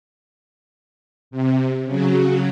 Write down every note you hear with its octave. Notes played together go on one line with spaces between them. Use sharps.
C3
C#3 F#3